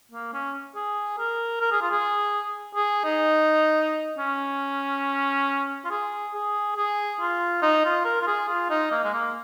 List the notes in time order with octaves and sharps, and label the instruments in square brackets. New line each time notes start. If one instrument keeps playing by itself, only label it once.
[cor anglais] A#3
C#4
G#4
A#4
A#4
G#4
F4
G#4
G#4
D#4
C#4
F4
G#4
G#4
G#4
F4
D#4
F4
A#4
F4
G#4
F4
D#4
A#3
G#3
A#3